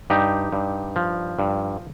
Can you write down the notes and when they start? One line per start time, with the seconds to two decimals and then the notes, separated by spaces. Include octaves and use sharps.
0.10 G2 D#4 G4
0.52 G2
0.96 F3
1.39 G2